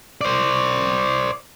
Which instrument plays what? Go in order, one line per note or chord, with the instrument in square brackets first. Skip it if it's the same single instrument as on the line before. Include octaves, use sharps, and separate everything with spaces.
[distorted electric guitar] C5 D5